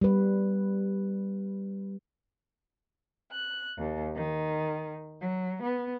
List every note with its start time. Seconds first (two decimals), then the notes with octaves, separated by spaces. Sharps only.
0.01 G3 B4
3.31 F#6
3.77 D#2
4.15 D#3
5.21 F#3
5.62 B3